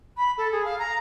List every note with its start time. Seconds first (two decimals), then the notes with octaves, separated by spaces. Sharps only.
0.17 B5
0.38 A4
0.52 G#4
0.65 F5
0.79 A#5